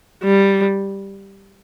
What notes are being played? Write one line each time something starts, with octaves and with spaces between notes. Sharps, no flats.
G3